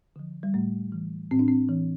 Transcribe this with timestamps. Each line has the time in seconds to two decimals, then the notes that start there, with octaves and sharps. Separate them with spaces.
0.16 D3 F3
0.43 G3
0.54 A2 A3
0.92 E3
1.31 A2 C4
1.39 D4
1.48 C4
1.69 E3